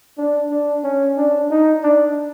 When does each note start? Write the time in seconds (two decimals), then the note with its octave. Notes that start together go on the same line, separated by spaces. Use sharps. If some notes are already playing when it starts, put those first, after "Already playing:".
0.18 D4
0.50 D4
0.84 C#4
1.17 D4
1.50 D#4
1.83 D4